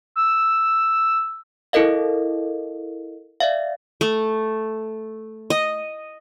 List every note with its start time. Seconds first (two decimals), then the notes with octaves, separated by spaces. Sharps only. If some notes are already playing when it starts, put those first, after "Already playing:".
0.16 E6
1.73 E4 A4 A#4 D#5 F5
3.40 D5 E5 F5
4.01 A3
5.50 D#5